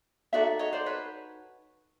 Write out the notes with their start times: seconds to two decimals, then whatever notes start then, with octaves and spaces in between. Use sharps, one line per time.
0.33 D#4 F#4 A4 D5 E5
0.59 C#5 D#5
0.73 C5 D5
0.86 B4 C#5